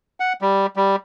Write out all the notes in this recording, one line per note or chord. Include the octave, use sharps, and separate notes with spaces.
F#5
G3
G3